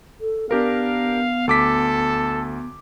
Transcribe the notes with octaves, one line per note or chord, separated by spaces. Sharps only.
A4
B3 D4 G4 A#4 F5
D2 A4 D6 B6